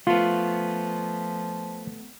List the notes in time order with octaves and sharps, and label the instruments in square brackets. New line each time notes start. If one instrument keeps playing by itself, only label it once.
[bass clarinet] F3 [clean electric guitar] A3 B3 [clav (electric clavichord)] F4